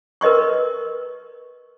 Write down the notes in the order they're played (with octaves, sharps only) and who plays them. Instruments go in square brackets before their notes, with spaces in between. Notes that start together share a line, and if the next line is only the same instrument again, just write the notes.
[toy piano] A#4 B4 D#5 C6 C#6